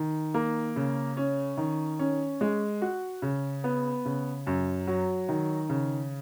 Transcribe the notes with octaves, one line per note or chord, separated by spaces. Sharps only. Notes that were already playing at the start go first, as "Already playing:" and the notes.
Already playing: D#3
A#3
C#3
C#4
D#3
C#4
G#3
F#4
C#3
B3
C#3
F#2
F#3
D#3
C#3